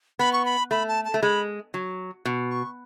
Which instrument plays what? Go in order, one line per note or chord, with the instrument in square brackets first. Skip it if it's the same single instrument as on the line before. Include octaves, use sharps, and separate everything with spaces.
[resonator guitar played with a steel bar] B3 [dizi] B5
[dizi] C#6
B5
[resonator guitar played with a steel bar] A3 [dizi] B5
[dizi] A5
A5
[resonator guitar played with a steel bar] A3
[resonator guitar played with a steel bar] G#3 [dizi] B5
[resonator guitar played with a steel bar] F#3
B2
[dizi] C#6